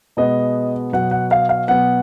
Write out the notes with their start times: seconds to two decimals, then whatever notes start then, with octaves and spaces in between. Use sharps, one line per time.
0.17 B2 G#3 B3 D#5
0.93 B2 F#3 B3 F#5
1.11 F#5
1.31 F5
1.49 F5
1.68 B2 F#3 B3 F#5